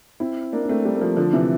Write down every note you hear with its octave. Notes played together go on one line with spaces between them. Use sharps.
C4 E4
A#3 D4
D4
A3 C4
G3 A#3
A#3
F3 A3
D3 F3
C3 E3